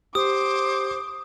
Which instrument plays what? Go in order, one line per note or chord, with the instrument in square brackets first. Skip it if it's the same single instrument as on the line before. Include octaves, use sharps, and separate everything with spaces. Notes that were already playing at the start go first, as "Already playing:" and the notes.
[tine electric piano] G4 [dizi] C5 [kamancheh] D6 [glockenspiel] D#6